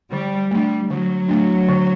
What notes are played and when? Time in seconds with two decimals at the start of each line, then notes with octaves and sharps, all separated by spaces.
0.12 D3 G3
0.51 G3 A3 D4
0.89 D3 F#3
1.28 A3 D4
1.68 D3